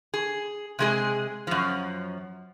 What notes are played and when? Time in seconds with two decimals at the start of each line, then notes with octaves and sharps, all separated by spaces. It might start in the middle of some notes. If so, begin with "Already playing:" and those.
0.14 G#4
0.79 C3 G#3 G#4
1.47 F#2 F3